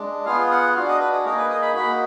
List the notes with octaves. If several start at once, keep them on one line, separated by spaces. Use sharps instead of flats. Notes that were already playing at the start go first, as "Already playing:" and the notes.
Already playing: G#3 D4
B3 F4 G#4 F5
F#5
D4 F#4 F5
D#5
B4
G#4
A#3 D#4 G#4 A#4
B4
D#5
B5
A#3 D#4 F#4 B5